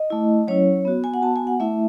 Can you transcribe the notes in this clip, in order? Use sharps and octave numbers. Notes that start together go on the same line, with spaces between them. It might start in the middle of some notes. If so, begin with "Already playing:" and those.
Already playing: D#5
A3 E4
F#3 C#4 E4 C#5
B3 F#4
G#5
F#5
B3 F#4 A5
G#5
F#5
A3 E4 E5